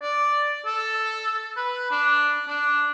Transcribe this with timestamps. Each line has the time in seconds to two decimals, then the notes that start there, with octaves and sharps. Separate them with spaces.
0.02 D5
0.66 A4
1.57 B4
1.91 D4
2.48 D4